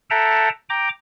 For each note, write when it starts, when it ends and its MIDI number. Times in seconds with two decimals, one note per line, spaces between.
0.10 0.49 69
0.10 0.49 76
0.10 0.49 78
0.10 0.49 79
0.10 0.49 81
0.10 0.49 82
0.70 0.89 79
0.70 0.89 82
0.70 0.89 86